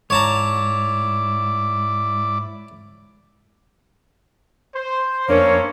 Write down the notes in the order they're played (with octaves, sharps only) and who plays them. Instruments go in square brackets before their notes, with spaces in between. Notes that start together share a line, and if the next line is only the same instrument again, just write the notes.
[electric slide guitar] G#2 [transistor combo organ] E4 D5 D6 [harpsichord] C#5 A5 A#5
[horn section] C5
[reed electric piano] F2 D4 A#4 [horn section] A3 A#3 C#4 [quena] C#5